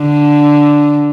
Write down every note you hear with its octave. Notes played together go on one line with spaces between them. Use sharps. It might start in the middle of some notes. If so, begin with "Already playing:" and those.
Already playing: D3